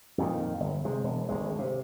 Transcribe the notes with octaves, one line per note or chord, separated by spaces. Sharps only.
F2 A#2 D#3
G1
C3 G#3
E1
G#1 D2 G#3
C3